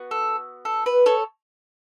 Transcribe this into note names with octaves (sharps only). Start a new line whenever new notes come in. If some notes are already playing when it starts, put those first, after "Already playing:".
Already playing: B3 F#4
A4
A4
B4
A4 C#5